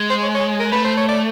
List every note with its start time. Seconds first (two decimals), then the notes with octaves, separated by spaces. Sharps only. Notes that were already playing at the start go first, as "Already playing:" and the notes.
Already playing: G#3
0.10 C5
0.22 C#5
0.35 C#5
0.60 A#4
0.72 A3 B4
0.84 C5
0.97 C#5
1.09 D5